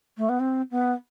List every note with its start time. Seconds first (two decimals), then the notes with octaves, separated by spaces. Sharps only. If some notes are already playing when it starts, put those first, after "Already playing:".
0.17 A3
0.29 B3
0.40 C4
0.71 B3